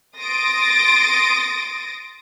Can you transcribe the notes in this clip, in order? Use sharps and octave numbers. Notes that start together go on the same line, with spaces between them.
C6 D#6 A6 A#6 D7